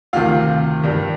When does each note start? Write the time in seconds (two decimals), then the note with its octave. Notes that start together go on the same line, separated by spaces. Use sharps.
0.13 D2 C3 D#3 F4 F5
0.83 G2 D#3